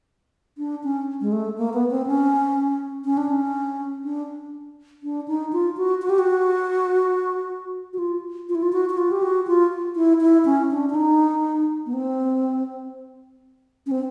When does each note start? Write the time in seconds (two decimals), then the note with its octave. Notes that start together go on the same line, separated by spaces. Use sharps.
0.58 D4
0.84 C#4
1.21 G#3
1.32 A3
1.58 A#3
1.74 B3
1.90 C4
2.07 C#4
3.05 C#4
3.17 D4
3.29 C#4
4.04 D4
5.03 D4
5.28 D#4
5.53 F4
5.77 F#4
6.02 F#4
6.10 G4
6.19 F#4
7.93 F#4
7.98 F4
8.49 F4
8.55 E4
8.62 F4
8.73 F#4
8.90 F#4
8.98 F4
9.11 G4
9.22 F#4
9.47 F4
9.96 E4
10.21 E4
10.45 C#4
10.71 D4
10.89 D4
10.95 D#4
11.86 B3
11.93 C4
13.86 C#4
13.91 C4